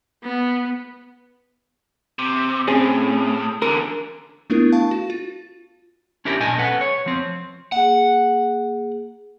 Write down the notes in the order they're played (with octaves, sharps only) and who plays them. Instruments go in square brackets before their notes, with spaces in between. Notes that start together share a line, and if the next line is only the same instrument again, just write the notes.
[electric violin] B3
[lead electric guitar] C3
[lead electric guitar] A2 [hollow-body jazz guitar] C4 C#4 G#4
[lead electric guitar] E2 D3 [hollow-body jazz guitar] A#4
[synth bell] A3 B3 D4 E4 F4 A#4
F5 A5 C#6
F#4
F4
[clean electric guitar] C#4 D4 E4 G4 A#4
B1 A#2 D#5 G#5 A5
C#4 A4 B4 F#5
C#5
F3 C4
[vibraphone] A#3 G#4 [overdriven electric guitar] F#5